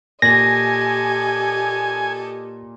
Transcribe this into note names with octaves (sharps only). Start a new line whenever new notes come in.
A#2 G4 A4 D#5 G#5 A#6